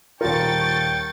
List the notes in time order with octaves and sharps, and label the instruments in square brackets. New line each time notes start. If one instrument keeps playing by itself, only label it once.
[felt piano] D#1 F4 [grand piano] A#4 [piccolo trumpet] G5 [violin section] C#6 A6 C#7